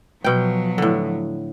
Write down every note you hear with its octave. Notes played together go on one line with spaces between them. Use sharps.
B2 F3 F#3 G5
A2 D3